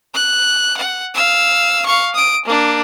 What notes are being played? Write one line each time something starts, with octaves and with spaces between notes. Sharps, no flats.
F#6
F#5
F5 E6
F5 C#6
D#6 D7
A#3 D4